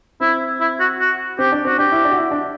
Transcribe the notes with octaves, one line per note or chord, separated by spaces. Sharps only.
C4 E4
E4
F#4
F#4
C4 G4
D4
C4 F#4
D4 G4
E4
D4
F#4
E4
D4